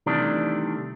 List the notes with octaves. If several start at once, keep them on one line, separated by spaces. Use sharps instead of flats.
C3 D#3 E3 G3 A3 D4